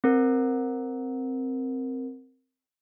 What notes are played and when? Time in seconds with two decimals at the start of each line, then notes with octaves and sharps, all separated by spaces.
0.04 C4 A#4